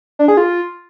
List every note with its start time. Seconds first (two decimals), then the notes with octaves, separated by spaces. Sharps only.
0.19 D4
0.28 G#4
0.37 F4